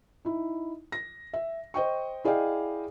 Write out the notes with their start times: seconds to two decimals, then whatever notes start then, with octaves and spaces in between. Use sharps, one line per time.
0.25 D#4 E4
0.92 A#6
1.33 E5
1.74 C5 D#5 G5 C#6
2.25 E4 G#4 D5 D#5 F5 G5